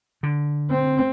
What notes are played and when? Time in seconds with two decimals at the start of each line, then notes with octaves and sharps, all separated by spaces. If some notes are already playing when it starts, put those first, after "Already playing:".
0.23 D3
0.71 C4